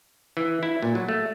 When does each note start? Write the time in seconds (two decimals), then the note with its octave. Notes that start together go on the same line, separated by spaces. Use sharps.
0.37 E3
0.63 E4
0.83 A#2
0.95 F#3
1.09 A3